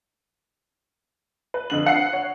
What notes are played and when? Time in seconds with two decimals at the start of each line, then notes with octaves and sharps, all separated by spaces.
1.54 B4
1.70 F2 D3 F#7
1.86 F#5 C7
2.13 C#5